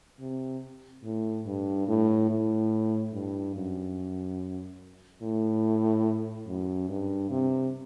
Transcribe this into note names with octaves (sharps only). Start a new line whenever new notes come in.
C3
A2
G2
A2
A2
G2
F#2
A2
F#2
G2
C3